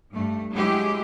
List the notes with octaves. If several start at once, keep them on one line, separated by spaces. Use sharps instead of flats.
G2 A3
F#3 G#3 E4 G4 G#4